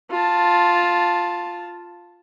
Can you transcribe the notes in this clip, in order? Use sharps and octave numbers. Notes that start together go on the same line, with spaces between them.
F4 A5